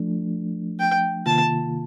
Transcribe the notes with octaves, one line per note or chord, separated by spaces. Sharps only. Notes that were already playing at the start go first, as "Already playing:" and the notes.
Already playing: F3 A3 D4
G5
C3 D#3 A#3 F4 A5